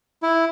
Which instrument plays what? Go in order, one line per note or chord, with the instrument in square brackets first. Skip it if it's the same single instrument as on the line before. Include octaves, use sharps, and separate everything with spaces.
[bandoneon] E4